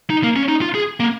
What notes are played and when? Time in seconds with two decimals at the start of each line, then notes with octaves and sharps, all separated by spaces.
0.10 D#4
0.23 A#3
0.36 C#4
0.49 D#4
0.62 F4
0.75 G#4
1.00 A#3